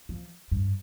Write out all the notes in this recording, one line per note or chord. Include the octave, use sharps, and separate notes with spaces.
F3
G2